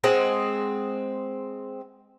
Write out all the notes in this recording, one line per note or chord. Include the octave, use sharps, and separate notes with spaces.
G#3 C4 G#4 F#5